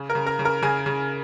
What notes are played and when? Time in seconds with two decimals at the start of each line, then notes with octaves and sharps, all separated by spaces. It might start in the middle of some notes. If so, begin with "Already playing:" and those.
Already playing: C#3
0.09 A#4 A#5
0.15 C#3
0.26 A#4 A#5
0.39 C#3
0.45 A#4 A#5
0.62 C#3 G#4 G#5
0.86 C#3